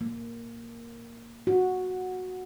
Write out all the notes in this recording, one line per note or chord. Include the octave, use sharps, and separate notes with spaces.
A#3
F#4